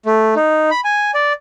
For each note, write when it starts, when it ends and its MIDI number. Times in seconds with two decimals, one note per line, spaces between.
0.06 0.35 57
0.36 0.70 63
0.71 0.80 83
0.84 1.11 80
1.14 1.33 74